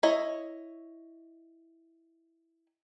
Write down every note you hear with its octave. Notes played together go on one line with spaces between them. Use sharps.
E4 C#5 D#5